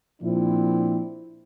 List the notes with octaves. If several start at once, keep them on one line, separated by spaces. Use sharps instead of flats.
A#2 F3 C4 D4 E4